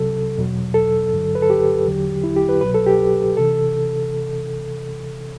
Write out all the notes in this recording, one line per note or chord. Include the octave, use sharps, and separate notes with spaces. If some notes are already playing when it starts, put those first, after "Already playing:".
Already playing: C2 C3 F#3 A4
E2 B2 F#3
A4
G2 D3 F#3
B4
A4
G4
E2 D3 F#3
E4
G4
B4
C2 B2 F#3 B4
A4
G4
C3 E3 A4